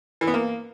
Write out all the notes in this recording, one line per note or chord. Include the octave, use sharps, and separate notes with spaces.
E3
B3
A#3